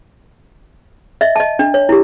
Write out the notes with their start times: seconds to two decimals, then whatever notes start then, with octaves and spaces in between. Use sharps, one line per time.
1.21 D#5 E5
1.36 D#5 A5
1.59 D4
1.74 C#5
1.89 E4 G4